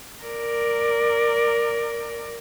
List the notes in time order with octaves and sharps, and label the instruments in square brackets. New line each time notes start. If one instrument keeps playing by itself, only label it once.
[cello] A#4 D5